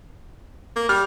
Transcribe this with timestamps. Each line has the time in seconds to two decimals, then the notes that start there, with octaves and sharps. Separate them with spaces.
0.76 A#3
0.89 G3 F6